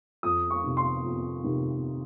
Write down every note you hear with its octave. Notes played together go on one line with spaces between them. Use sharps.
F2 D#6
C#6
C3 D#3
C6
F2
C3 D#3